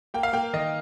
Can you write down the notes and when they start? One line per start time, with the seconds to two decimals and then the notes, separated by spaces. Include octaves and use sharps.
0.14 A#3 G5
0.23 F5
0.33 A#3 G5
0.53 D#3 D#5